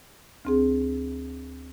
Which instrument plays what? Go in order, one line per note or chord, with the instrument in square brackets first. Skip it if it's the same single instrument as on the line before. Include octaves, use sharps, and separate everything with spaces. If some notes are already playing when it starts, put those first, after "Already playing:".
[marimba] D2 C4 G#4